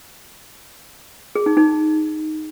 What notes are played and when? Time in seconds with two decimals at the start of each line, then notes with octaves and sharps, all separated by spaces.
1.35 G#4
1.46 D#4
1.57 D#4